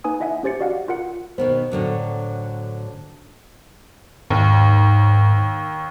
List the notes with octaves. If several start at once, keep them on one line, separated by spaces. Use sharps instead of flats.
A#3 D#4 B4 G#5 D#6
E4 D#5 E5 F#5 G#5
C#4 G4 C5 A6 C#7
F#4 D5 D#5 F5 F#5
F4 A#4 F#5 C#7
B2 D#3 B3 C5
A2 D3 F#3
D#2 G#2